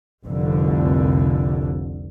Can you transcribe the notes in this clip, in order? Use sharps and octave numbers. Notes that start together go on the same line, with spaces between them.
F1 C2 D3